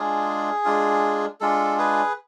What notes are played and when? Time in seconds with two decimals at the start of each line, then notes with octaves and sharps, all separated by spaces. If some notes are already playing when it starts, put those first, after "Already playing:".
Already playing: G#3 D4 F4 G#4
0.65 G#3 D4 F4
1.40 G#3 D4 F4 A4
1.78 G#4 B4